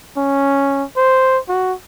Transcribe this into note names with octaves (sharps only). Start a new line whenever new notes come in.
C#4
C5
F#4